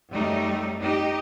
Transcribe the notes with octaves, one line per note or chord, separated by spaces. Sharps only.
F#2 G3 A3 D#4
D#4 G4 D#5